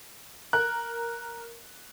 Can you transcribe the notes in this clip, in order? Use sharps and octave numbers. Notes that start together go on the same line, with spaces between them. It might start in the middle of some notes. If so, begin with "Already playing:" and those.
A#4 F#6